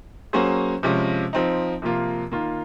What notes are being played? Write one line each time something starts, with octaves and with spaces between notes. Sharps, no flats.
F#3 A#3 C#4 G#4 C5
C3 F3 G#3 C#4
F3 C4 D#4
C3 F3 A#3 F4
D#3 A#3 F4